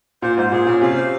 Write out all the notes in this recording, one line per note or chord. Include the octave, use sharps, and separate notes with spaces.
A#2 C5
G#2 C5
A#2 G#4
A#2 C#4
C3 F5
C5